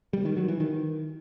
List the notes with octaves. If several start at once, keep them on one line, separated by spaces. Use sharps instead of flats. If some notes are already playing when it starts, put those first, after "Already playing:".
G3
D#3
F#3
E3
D#3